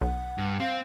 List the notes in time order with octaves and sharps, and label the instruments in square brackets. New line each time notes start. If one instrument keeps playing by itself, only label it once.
[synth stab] B1 [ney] F#5
[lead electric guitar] G2
[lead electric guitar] C4 [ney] F5